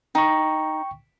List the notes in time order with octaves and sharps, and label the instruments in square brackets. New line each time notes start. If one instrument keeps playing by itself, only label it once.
[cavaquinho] D#4 [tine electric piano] G5 C#6